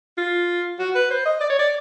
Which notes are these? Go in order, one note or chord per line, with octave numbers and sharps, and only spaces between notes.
F4
F#4
B4
C5
D#5
D5
C#5
D5